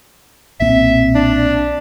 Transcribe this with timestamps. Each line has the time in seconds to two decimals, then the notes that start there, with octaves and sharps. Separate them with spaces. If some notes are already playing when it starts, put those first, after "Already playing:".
0.60 B1 A#2 C4 E5
1.15 D4